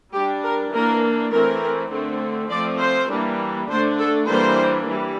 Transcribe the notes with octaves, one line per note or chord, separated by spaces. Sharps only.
G3 D4 G4
A#4
E3 A#3 D4 A#4
E3 A3 C4 A#4
D3 A3 C4
F3 A3 C4 D5
C5
E3 G3 A#3 D4
D3 A3 D4 C5
A4
E3 G3 A#3 D4 C5
E3 G3